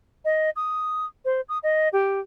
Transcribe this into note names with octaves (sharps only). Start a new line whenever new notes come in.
D#5
D#6
C5
D#6
D#5
G4